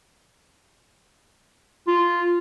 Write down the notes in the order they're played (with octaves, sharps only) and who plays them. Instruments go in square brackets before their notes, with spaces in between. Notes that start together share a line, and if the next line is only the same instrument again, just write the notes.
[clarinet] F4